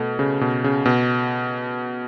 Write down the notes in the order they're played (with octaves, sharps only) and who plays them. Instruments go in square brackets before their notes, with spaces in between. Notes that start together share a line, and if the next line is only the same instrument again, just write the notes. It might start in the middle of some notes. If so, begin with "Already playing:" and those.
Already playing: [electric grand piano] B2 [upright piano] A3
[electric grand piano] C#3
B2
C#3
B2